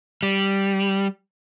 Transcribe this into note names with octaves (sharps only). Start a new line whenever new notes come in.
G3